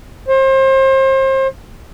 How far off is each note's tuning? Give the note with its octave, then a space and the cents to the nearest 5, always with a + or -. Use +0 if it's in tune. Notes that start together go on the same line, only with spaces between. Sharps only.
C5 +35